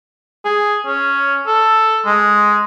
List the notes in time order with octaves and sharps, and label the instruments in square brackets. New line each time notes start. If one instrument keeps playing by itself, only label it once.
[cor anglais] G#4
C#4
A4
G#3